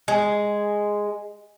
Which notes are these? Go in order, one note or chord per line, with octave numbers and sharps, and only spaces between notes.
G#3